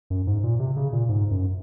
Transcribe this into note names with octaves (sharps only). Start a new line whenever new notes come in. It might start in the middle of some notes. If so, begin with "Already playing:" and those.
F#2
G#2
A#2
C3
C#3
A#2
G#2
F#2